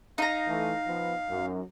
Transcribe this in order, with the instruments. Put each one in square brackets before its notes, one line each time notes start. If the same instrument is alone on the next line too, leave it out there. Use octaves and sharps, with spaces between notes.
[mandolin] D#4 A#5 [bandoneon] F5
[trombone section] E3 A3
F3 B3
F#2